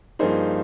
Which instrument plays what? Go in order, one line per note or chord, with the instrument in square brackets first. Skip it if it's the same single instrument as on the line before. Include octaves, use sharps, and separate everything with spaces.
[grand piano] G2 F3 A#3 D#4 G#4 C5